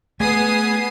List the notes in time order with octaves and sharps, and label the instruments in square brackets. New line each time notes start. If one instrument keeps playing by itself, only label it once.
[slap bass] A3 [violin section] B3 D#6 C7 [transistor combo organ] G#4